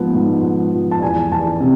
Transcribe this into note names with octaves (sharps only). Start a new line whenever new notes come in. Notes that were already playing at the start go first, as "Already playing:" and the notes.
Already playing: G#2 F3 B3
G#2
F3
F3
A5
E2 G#5
E2 A5
C3